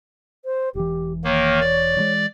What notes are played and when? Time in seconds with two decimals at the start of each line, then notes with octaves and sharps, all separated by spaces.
0.45 C5
0.75 E1 E3 G4
1.25 D#3 A#3 C#5
1.61 D5
1.97 E3 F3 G#3